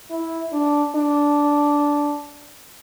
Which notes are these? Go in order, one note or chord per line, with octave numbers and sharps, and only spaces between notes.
E4
D4
D4